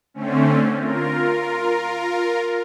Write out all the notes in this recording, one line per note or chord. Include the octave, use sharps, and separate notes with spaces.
D3 A3 C4 C#4
F4 A#4